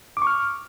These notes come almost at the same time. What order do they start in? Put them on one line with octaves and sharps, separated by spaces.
D6 C#6 F6